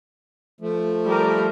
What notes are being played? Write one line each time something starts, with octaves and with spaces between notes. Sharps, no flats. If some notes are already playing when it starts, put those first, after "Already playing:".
F3 A3
G3 A#4